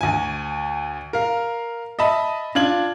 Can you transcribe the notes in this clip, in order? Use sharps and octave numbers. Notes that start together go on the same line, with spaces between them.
D2 G#5
A#4 F5
D#5 E5 A5 B5
D4 F4 G#6 F#7